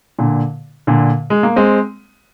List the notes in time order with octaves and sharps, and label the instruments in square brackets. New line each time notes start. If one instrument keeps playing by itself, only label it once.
[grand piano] A#2 D3
A#2 D3
G#3
A#3
G#3 C4